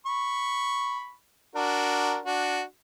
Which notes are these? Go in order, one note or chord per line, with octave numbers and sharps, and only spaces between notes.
B5 C#6
D4 F#4 A#4
D4 F#4